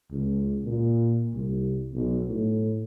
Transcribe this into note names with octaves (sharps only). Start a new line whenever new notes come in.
C#2
A#2
C2
B1
A2